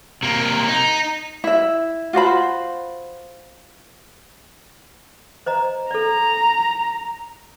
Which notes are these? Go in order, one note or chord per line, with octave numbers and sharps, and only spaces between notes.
C3 A#3
D#4
E4 E5
F4 F#4 C5 B5
C5 D#5 A#5
A4 D5 A#5